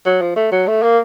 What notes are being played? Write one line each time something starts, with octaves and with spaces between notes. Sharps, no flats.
F#3
F3
A3
F#3
A3
A#3